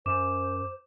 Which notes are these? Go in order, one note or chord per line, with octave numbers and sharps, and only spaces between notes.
F#2 C5 D6 E7